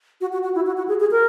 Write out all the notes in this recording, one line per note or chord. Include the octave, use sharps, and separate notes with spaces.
F#4
F#4
F#4
E4
F#4
F#4
G#4
G#4
A#4